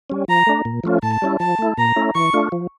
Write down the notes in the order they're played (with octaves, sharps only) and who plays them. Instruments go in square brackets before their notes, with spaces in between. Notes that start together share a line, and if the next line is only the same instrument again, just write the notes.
[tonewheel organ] G3 C#4
[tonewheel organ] F3 [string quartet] A#5
[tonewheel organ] A3 D4
A#2
F3 A3 C#4 F4
[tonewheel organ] A2 [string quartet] A5
[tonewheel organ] G3 C#4 E4
[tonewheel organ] F3 [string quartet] A5
[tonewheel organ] A3 E4
[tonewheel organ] A#2 [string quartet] A#5
[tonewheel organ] A3 C#4 E4
[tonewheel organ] E3 [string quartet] C#6
[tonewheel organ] A3 D4 F4
F3